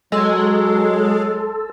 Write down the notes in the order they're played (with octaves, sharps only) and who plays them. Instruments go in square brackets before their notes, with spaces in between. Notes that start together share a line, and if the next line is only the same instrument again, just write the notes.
[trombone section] F#3 [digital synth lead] G#3 [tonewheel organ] A4 [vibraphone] C6 E6